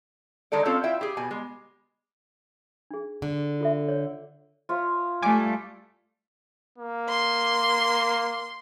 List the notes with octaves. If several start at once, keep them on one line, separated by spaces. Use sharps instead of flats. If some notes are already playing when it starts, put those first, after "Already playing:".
D3 D#3 G#3 D#4 A4 D5
C4 C#4 F4 A4 C#5
E4 F4 E5 G5
G4 G#4
B2 G#5
G#3
D4 G#4
D3
F4 A4 E5
C#5
F4 C#5 E5
G3 A3 G#5 D6
A#3
C6